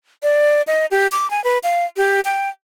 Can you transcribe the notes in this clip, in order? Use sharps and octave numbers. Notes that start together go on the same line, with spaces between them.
D5
D#5
G4
D6
G#5
B4
F5
G4
G5